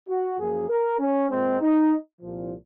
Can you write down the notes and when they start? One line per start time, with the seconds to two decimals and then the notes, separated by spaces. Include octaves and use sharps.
0.09 F#4
0.39 F#2 F3 A#3 G#4
0.69 A#4
0.99 C#4
1.30 A#2 G#3 C4
1.61 D#4
2.21 C2 A#2 F3